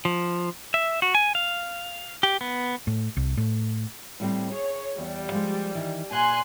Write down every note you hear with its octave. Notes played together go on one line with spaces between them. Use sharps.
F3
E5
F#4
G#5
F5
G4
B3
A2
C2
A2
A2 G3 C4
G#4 C#5
E2 G3 F#5
F3 G#3
D#3 E3
A#2 G#5 C6 F#6